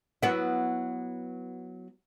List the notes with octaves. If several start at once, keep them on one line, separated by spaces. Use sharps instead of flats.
F#3 B3 E4